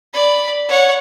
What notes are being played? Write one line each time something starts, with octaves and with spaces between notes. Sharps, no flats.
D5 B5
C#5 F#5